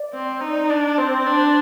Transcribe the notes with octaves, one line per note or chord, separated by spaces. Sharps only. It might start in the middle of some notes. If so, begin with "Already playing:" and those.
Already playing: D5
C4
D#4
D4
C4 C5
D4 C5